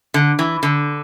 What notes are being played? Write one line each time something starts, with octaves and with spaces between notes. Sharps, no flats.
D3
E3
D3